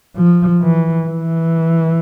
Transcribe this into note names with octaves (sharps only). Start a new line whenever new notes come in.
F3
E3
E3